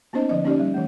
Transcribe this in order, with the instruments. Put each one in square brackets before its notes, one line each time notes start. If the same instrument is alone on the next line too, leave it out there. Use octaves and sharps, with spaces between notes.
[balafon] A#3 B3 C#4 D#4 C5 D#5
D3 F3 D#5
A#3 C#4 D#4 G4 D5
G3
E3 A3